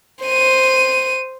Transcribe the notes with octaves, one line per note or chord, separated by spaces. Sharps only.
C5 D#7